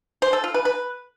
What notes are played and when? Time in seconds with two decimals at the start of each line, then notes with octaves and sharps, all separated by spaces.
0.22 C5
0.33 A4
0.44 F4
0.54 B4
0.65 B4